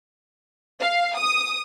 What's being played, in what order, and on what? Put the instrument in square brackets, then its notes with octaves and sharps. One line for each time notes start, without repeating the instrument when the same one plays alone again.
[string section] F5
D#6